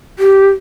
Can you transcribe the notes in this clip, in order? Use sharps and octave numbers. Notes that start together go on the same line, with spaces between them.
G4